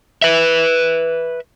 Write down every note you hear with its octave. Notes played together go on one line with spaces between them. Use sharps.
B4 E5